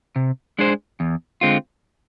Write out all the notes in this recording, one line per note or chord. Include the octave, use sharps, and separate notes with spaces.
C3
G#3 D4 G#4 C5
E2
D3 G#3 C4 F4